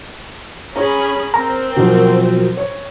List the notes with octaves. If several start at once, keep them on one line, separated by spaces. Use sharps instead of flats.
C#4 G#4 C#5 A#5 B5
C4 A#4
B2 F3 F#3
C#5